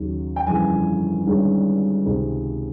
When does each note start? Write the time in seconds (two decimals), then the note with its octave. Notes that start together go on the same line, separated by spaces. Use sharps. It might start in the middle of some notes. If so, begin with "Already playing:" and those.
Already playing: D#2 C#3 F#3
0.36 G5
0.47 G1 F2 C#3 E3 G#5
1.26 G1 G2 D#3 G#3 C#4
2.06 C#2 C3 D#3 G#3 C4